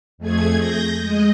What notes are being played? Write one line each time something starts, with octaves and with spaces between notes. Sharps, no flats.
F2 A3 G#4 G#6
G6 A#6
G#3 D#5